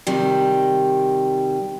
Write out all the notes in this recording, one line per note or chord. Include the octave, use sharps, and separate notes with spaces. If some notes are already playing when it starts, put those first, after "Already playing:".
C3 D#3 G3